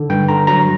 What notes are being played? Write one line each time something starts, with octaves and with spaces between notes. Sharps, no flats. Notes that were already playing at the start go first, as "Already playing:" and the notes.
Already playing: D3
G2 G5
D3 A#5
F#3 A#5